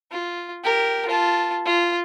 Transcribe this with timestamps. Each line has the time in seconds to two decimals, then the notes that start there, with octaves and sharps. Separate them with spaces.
0.12 F4
0.64 G4 A#4
1.08 F4 A5
1.66 F4